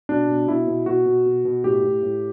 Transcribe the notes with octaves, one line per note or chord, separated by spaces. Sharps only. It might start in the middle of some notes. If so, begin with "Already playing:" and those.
B2 D4
B2
B2 E4
B2
B2 F#4
B2
B2
B2
A2 G4
A2
A2